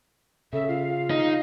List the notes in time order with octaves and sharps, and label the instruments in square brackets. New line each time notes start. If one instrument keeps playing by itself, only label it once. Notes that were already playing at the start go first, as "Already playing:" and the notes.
[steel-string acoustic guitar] C#3 [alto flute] A4 [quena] E5
[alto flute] F4 [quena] F5
[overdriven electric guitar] D#4